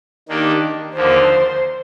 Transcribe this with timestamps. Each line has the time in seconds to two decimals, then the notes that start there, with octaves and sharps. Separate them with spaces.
0.29 D#3 A#3 D4 G4
0.95 D#2 D3 F3 A#3 C5